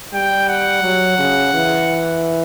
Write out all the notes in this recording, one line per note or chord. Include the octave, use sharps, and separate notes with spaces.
G3 G5
F#5
F#3
C#3
E3